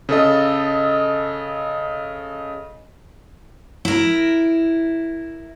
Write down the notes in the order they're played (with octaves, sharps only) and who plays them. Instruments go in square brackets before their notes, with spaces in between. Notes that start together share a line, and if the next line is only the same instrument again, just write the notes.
[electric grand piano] C#3 A4 D#5
[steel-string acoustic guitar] E4 A#4